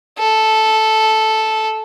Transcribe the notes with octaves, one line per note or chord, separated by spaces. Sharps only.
A4